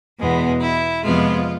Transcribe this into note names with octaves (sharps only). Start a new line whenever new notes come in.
E2 B2 G#3 B3
E4
F2 C3 F3 G#3 B3 F4